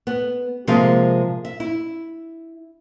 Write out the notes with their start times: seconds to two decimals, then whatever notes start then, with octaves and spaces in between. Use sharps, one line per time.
0.07 B3
0.67 C3 F3 G#3 A#3 G#4 F5
1.45 E5
1.60 E4